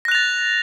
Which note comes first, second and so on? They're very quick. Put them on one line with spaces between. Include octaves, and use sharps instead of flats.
A#6 F#6 F7 A6